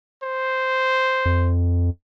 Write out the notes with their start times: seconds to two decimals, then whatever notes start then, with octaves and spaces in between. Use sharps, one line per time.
0.23 C5
1.25 F2